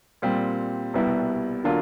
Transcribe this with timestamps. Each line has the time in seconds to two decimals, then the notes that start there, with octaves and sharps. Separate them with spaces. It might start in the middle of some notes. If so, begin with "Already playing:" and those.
0.22 A#2 G3 C4
0.94 C2 B2 G3 B3 E4
1.64 D3 F#3 A#3 D4 F4